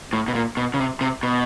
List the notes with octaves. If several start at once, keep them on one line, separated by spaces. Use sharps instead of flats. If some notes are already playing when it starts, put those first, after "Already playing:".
A2
B2
A#2
B2
C#3
C3
C3
B2